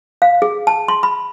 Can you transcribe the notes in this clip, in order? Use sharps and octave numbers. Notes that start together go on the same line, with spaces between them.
F5
G#4
A5
C6
B5